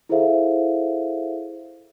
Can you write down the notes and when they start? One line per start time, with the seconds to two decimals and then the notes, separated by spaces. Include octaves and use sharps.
0.09 E4 G#4 A4 C5 E5 F5